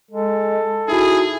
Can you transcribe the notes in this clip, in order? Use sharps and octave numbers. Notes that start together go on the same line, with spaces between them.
G#3 A4
D#4 E4 F#4 G#4